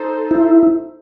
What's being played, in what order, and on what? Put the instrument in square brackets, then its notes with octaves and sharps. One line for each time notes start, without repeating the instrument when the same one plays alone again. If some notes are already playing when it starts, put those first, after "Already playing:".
Already playing: [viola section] D#4 A4 C5
[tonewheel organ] E4